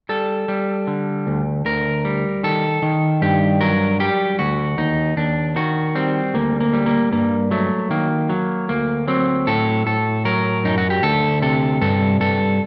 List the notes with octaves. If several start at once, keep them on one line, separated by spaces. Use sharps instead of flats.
G3 A4
G3
D3
D2
D2 A#4
G3
D#3 A4
D#3
G2 G4
F#3 A#4
G3 G4
D2 F#4
D#2 D#4
D#2 D4
D#3 F#4
G3 C4
D2 A#3
A#3
G3
A#3
G2 A#3
F#3 A3
D#3 A#3
F#3
D2 A#3
F#3 C4
A2 A4
A2 A4
F#3 A#4
F#2 D#4
F#4
G4
D2 A4
C3 A4
G2 A4
G2 A4